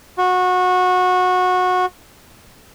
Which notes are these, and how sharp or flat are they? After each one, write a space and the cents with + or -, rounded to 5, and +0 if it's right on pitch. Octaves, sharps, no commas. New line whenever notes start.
F#4 -20